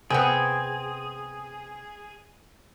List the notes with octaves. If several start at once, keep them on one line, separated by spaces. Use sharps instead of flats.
C3 B3 C4 G#4